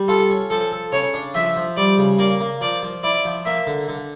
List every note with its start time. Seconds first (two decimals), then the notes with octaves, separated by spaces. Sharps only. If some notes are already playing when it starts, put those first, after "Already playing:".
Already playing: G3
0.08 F4 A4
0.30 C#4
0.50 F3 A4
0.72 A4
0.92 C#3 C#5
1.14 D4
1.35 F3 E5
1.56 F3
1.77 G3 D5
1.98 C#3
2.19 A#3 D5
2.40 A#3
2.61 F3 D5
2.83 F3
3.04 E4 D5
3.25 F3
3.46 A#3 E5
3.67 D3
3.88 D3